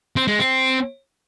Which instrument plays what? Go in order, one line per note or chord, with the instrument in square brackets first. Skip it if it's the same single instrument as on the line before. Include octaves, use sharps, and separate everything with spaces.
[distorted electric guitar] C4
G#3
C4